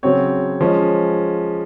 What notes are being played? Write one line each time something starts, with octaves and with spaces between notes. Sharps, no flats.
C#3 F#3 C4 C#5
F3 G#3 C#4